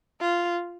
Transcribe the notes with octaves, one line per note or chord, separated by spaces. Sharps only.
F4